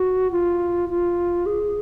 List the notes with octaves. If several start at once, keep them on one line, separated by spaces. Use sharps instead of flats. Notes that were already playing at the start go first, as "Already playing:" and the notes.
Already playing: F#4
F4
F4
G#4